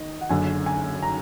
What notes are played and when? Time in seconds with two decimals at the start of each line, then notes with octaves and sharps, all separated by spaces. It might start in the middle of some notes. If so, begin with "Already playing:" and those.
Already playing: D#3 D#5
0.21 F#5
0.29 F#1 F#2 D3 G#5
0.66 G#5
1.03 A#5